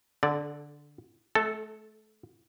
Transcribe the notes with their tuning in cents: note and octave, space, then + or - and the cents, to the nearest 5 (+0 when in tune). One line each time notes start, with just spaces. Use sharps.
D3 +0 A4 -30 D5 +0
A3 -30 A4 +0 A5 -10